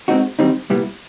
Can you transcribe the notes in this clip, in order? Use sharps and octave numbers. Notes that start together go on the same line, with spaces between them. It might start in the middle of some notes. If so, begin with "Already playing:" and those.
B2 G#3 C4 D#4 F#4
F#2 D#3 G3 C4 D#4
C2 A#2 G3 B3 E4